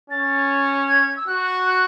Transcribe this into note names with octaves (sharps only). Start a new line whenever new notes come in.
C#4 A6
G#6
E6
F#4 F#6
F#6